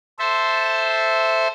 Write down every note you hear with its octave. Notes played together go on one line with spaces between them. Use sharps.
A4 C5 E5